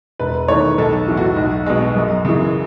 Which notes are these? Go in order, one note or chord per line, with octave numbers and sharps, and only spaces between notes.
E1 B4
E2 D#3 A3 C#5
B1 A4
A2 E3
F#4
B1
B2 G#3
F#2
C#3 E3